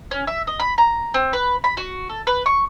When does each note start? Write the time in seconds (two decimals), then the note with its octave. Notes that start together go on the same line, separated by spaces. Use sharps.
0.11 C#4
0.27 E5
0.47 D#5
0.60 B5
0.78 A#5
1.14 C4
1.33 B4
1.64 B5
1.77 F#4
2.09 A4
2.27 B4
2.46 C#6